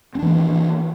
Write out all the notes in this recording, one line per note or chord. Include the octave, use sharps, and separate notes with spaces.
E3 A#3 C4 D4